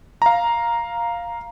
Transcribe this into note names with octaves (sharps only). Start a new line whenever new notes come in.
F5 A#5